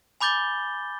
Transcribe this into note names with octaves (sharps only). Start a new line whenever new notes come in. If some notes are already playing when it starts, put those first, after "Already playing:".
G#5 B5 D6 G6 A6 G7